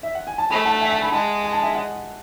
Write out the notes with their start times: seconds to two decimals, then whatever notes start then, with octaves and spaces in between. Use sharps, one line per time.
0.03 E5
0.15 F#5
0.27 G#5
0.38 A5
0.50 A3 G#5 B5
0.65 F#5 A5
0.81 E5 G#5
0.91 F#5 A5
1.02 G#5 B5
1.12 G#3 F#5 A5
1.44 G#5
1.53 A5
1.63 E5 G#5
1.75 D#5 F#5